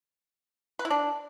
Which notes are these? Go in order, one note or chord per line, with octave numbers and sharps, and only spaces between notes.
B4
E4
D4